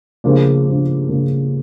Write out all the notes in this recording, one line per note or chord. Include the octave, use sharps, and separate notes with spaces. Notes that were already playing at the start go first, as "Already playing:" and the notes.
C#3 F3 A#3 D4
C#3 F3 A#3 D4
C#3 F3 A#3 D4